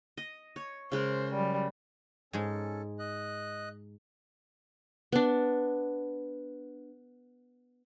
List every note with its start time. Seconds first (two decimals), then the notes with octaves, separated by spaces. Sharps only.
0.17 D#5
0.56 C#5
0.92 C#3 G#3 A#4 C5
1.33 F#3 G3
2.33 G#2 G#3 C#4 A4
2.99 D#5 F#6
5.12 B3 D4